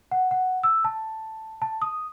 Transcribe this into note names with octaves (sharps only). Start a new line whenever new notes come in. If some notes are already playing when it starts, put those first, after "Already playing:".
F#5
F#5
E6
A5
A5
D#6